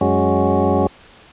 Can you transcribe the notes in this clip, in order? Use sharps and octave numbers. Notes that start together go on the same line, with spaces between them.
F#2 G#3 C#4 F#4